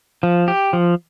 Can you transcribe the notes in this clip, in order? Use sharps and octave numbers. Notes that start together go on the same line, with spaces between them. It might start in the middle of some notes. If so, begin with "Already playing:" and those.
F3
G4
F3